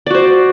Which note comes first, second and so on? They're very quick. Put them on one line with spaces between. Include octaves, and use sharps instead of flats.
D5 F#4 C5